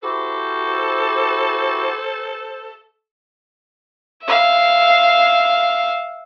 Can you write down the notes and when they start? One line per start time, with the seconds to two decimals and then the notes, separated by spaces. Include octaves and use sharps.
0.03 E4 F#4 G4 A4 C5
4.24 E5 F5